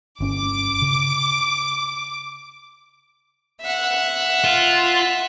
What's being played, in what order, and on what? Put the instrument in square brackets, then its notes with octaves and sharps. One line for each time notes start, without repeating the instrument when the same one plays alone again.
[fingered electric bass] G1 C#4 [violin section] D6
[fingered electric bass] C#3
[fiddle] E5 F#5
[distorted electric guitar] F4